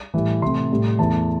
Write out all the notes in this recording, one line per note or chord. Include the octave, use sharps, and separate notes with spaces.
A2 E3 G3
C3 E3 A3 C6
A2 G3
E2 E3 A3 A5